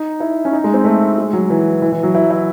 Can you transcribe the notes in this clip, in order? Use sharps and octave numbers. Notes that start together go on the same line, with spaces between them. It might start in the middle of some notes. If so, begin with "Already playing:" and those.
Already playing: D#4
E4
C#4
D#4
G#3
C4
A3
G#3
F#3
E3
E3
E3
F#3
E4
E4